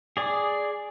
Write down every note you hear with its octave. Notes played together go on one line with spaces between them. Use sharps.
G#4 D5